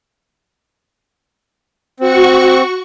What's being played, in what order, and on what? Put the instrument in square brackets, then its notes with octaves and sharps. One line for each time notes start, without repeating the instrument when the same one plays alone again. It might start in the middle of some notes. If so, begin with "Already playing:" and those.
[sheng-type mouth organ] C4 [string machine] F#4 C#6